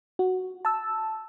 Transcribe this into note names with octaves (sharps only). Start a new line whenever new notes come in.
F#4
A5 E6